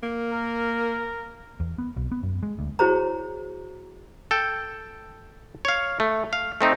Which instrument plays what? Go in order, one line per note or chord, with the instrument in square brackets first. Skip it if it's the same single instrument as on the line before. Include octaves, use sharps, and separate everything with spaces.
[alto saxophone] A#3
[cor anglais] A#4
[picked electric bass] E2
B3
B1
B3
F#2
G#3
D2
[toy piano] E4 F#4 G#4 C5 C#5 A#5
[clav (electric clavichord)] A4 G5
C#5 F5
A3
F5
A3 C4 D#4